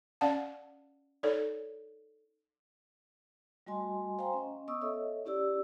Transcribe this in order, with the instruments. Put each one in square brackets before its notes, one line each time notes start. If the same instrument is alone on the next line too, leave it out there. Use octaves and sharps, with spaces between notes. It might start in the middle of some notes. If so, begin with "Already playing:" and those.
[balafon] C#4 D5 F5 F#5 A5
D#4 A4 C#5 D5
[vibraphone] G3 A3 F#4 D#5 G#5 C6
C5 F5 G5 G#5 A#5 C6
C#4 D#5
B3 D#5 C#6 D#6 E6
A4 C#5 D#5 E5
C#4 E4 G4 D5 E6